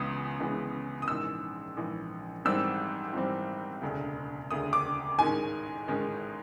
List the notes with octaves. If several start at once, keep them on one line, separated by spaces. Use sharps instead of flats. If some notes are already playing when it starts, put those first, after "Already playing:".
Already playing: C#2 C#3 E3 G#3 B3 D#6
C#2 C#3 E3 G#3 B3
D#6
A#1 G#2 E3 E6
A#1 G#2 E3
G#1 G#2 E3 G3 C4 E6
G#1 G#2 E3 G3 C4
E1 D2 C#3
E1 D2 C#3 D#6
D6
A1 G#2 D#3 G#3 C#4 G#5
A1 G#2 D#3 G#3 C#4